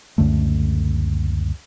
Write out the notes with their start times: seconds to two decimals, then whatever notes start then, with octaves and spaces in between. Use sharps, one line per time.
0.18 C#2 F#2 D3 A3